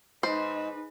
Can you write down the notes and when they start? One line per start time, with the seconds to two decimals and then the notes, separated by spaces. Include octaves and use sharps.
0.23 G#2 D#4 B4 C5 D#5